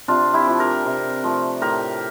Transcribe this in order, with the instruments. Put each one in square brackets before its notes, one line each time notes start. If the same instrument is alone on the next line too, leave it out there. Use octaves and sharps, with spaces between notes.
[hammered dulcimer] C3 D4 F4
E4 G4
F3 A3
G4 A#4
C3
F3 A3
A2 G4 A#4